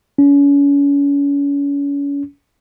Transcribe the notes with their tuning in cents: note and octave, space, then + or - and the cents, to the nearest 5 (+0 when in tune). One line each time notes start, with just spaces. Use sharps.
C#4 +35